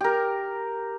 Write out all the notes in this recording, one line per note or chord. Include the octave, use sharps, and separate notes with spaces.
G4 A#4